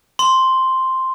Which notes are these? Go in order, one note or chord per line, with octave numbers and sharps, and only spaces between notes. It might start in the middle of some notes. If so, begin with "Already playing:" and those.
C6